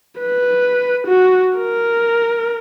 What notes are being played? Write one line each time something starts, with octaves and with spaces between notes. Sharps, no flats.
B4
F#4
A#4